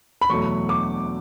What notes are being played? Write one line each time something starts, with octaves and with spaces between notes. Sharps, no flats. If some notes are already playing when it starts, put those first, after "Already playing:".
B5
E2 B2 F#3 A3 C#6
D6